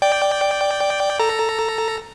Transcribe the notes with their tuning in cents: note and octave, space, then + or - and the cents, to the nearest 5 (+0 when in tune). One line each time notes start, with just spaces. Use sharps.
D5 +0 G5 +0
A4 +10 A#5 +0